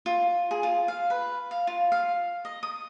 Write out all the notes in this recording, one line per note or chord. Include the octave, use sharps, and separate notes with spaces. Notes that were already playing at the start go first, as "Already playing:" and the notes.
F4
G#4
F4
F5
B4
F5
F4
F5
D#5
D#6